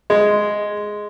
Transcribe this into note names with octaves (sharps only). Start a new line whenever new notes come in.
G#3